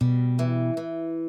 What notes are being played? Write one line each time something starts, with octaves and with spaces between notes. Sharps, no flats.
B2 G3
E3
E3